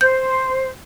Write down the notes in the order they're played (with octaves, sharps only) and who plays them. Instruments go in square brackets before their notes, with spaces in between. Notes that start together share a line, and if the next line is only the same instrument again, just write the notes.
[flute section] C5 [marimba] G6